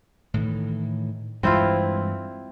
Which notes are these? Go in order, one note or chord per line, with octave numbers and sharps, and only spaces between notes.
A2 D#3 E3
G2 E3 G#3 C4 E4 F4